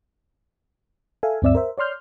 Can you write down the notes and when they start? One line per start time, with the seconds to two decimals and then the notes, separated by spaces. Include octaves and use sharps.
1.23 A4 E5 F5 G#5
1.42 D2 G2 C4 D5 E5 E6
1.55 A#4 C5 E5
1.78 C#5 D5 C6 F6 G6